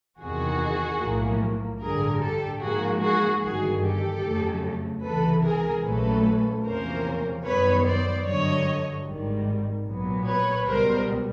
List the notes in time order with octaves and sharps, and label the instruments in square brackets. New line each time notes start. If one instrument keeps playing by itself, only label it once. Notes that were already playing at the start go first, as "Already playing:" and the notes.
[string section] E2 C3 D#3 F#4 G#4
B1 A2 F3 A#3
A1 G2 D3 G#4 A#4
G4 A4
G#2 F3 A#3 F#4 G#4
F#4 G#4
G1 G2 D#3 F#4 G#4
G4 A4
F2 C#3 F#3 A3
C#2 C3 E3 A4 B4
G#4 A#4
A#1 A#2 F#3 A3 C#4 A4 B4
E2 C3 F3 A#3 C#4 A#4 C5
F#2 D#3 G3 B3 B4 C#5
C5 D5
G2 D3 F#3 C#5 D#5
G#1 G#2 D#3 G3
B1 A#2 F#3 B3
B4 C#5
C#2 B2 G3 B3 A#4 C5